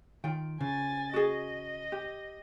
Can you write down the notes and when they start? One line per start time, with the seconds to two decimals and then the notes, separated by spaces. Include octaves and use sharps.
0.24 D#3 F4 G5
0.61 C#3 G#5 A6
1.14 F#4 G#4 D#5
1.92 G4